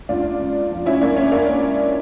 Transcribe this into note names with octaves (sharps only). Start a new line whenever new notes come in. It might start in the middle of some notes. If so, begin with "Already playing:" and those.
C#2 D4 F4
C#3
F3
C#4 E4
C#2 A#3 D4
C#4
C#2 A#3 D4